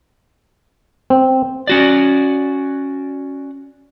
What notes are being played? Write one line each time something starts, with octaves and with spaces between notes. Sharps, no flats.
C4
C#4 F#4 D5